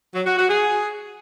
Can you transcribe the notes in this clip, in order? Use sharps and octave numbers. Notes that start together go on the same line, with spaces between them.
F#3
F#4
F#4
G#4